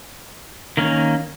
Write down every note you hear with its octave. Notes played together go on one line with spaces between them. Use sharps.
D#3 A#3 C#4